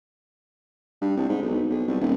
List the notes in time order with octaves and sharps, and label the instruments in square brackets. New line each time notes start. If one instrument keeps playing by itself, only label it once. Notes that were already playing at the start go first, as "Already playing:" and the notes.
[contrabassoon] G2
C2
G#2
B1
B1
C2
D#1